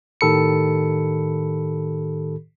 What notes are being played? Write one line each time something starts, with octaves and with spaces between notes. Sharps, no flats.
A2 D#3 G4 A4 B5 C#7